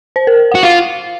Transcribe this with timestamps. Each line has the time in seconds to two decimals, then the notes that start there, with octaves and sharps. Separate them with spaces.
0.16 C5
0.27 A#4
0.52 F#4 F#5
0.63 F4 F5